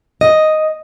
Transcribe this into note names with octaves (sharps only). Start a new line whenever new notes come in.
D#5